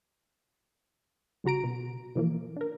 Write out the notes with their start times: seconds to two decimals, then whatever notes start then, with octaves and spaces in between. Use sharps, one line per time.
1.44 G1 C#3 F#4 A#5 D7
1.64 B2
2.16 B2 E3 F3 A#3
2.57 D4 A#4